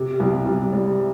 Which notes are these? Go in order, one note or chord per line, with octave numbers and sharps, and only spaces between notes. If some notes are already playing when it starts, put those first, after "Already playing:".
Already playing: C3
C2
C2
G3